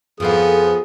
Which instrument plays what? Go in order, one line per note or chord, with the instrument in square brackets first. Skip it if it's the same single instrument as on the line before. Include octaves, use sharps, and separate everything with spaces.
[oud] F2 A4 F5 [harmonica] F3 B3 D#6 [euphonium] G#4